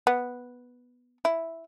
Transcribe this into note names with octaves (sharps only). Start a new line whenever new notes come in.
B3
E4